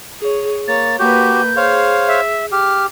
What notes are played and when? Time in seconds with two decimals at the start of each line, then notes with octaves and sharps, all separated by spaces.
0.19 G#4 C#5
0.68 A#3 C#5 A6
0.99 A#3 F#4 G4 B4 G6
1.56 G#4 C5 C#5 F5
2.08 E5
2.52 G4 F6